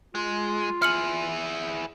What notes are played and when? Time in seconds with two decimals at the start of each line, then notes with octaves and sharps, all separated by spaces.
0.15 G#3 F4
0.82 E4 G#4 F6 C#7 F#7